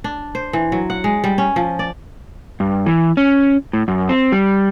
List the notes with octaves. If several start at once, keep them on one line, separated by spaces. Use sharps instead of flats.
D4
C5
E3
F#3
F#5
G#3
G3
C#4
F3
D5
G2
E3
C#4
A2
F#2
C4
G3